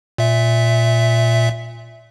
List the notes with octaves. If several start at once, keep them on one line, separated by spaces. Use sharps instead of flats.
A#2 E5